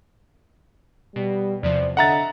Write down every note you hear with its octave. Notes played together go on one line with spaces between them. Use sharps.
B2 G3
E2 C3 F3 D5
D3 D#5 E5 F#5 A#5 A6